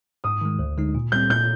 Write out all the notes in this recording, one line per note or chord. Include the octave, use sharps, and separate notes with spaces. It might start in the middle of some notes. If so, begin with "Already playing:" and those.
G#2 D#6
D#3 G#3
D2
D3 G#3 D#4
A#2
G3 C4 G6
A#2 G6